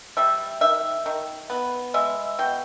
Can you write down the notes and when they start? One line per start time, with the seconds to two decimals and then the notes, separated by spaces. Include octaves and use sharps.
0.17 G3 E5
0.61 D#3 E5
1.06 D#3
1.50 B3
1.94 G#3 E5
2.39 B2 G5